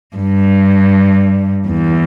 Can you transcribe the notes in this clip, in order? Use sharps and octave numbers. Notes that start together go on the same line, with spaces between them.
G2
E2